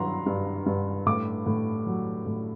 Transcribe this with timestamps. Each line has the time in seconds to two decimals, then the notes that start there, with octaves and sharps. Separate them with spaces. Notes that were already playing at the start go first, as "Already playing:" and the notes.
Already playing: G2 F#3 A#5 C6
0.26 G2
0.66 G2
1.06 A2 D6
1.46 A2
1.86 F#3
2.26 A2